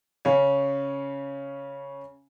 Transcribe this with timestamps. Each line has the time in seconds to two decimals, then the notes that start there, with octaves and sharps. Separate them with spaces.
0.25 C#3 C#4